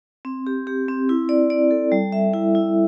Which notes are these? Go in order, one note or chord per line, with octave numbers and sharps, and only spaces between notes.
C4
G4
G4
C4
E4
D5
D5
A4
G3
E5
E4
E4